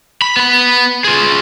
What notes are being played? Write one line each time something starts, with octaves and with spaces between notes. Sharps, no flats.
B5
B3 B5
F4 G#4